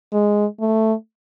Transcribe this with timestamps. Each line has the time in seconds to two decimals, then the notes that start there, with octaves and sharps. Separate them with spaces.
0.13 G#3
0.60 A3